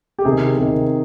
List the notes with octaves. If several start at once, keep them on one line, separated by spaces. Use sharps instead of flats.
G4
C3 D#3 G#4
C3 D#3